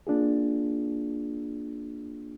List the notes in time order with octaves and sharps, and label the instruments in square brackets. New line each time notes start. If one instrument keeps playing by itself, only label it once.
[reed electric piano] A#3 D4 F4 G#4